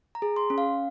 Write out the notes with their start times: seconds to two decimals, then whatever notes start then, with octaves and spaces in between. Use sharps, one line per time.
0.15 A#5
0.22 G#4
0.36 C6
0.50 C#4
0.58 F5